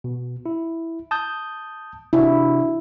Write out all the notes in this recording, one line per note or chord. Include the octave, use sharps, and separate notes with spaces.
B2
E4
A5 D#6 G6
C3 D4 E4 F#4